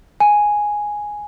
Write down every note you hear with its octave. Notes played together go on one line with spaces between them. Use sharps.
G#5